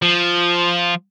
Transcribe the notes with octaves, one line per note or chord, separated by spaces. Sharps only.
F3